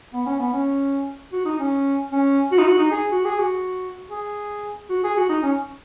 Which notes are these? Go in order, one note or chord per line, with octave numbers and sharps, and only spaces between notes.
B3
C#4
B3
C#4
F#4
D#4
C#4
C#4
F#4
D#4
F#4
D#4
G#4
F#4
G#4
F#4
G#4
F#4
G#4
F#4
D#4
C#4